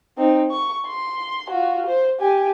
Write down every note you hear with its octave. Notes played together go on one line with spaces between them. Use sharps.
C4 D#4
C#6
C6
F4 F#4
C5
G4 G#5